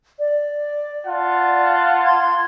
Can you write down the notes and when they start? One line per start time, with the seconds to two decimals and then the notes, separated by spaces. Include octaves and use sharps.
0.17 D5
1.07 F4 F#5 A5
2.05 C6 G#6